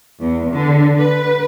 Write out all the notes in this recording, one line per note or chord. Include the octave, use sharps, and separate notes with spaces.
E2
D3
B4